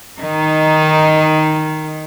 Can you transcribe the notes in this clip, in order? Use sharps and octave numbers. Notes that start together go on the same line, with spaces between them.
D#3 D#4